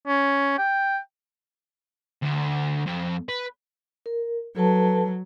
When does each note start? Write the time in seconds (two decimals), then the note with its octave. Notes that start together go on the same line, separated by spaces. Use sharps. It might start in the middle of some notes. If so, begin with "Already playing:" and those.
0.07 C#4
0.58 G5
2.22 D2
2.86 F2
3.29 B4
4.06 A#4
4.56 F#3 A4 B4 A5